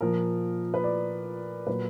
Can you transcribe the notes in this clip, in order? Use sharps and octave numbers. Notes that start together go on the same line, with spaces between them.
A#2 F3 A#4
B4
D5
A#2 F#3 B4